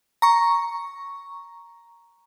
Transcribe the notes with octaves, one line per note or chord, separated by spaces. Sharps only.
A#5 C#6